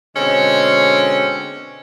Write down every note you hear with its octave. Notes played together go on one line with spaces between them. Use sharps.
B2 D3 G#3 C4 C#4